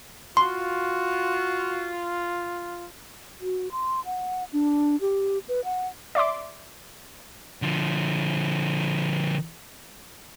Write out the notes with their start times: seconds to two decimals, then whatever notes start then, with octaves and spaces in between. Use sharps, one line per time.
0.37 F4 F#4 C6
3.41 F#4
3.72 C6
4.05 F#5
4.53 D4
5.01 G4
5.49 B4
5.65 F#5
6.15 D5 E5 C6 D6
7.62 D3 F3